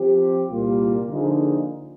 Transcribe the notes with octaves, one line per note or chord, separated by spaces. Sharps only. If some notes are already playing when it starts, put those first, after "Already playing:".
Already playing: F3 C4 G4
C2 A#2 G3 A#3 F4
D3 F3 A#3 D#4 G#4